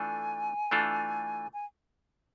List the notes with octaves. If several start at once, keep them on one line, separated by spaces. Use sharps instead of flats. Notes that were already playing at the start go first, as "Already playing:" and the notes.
Already playing: E3 A3 D4 F4 A4 G#5
E3 A3 D4 F4 A4
G#5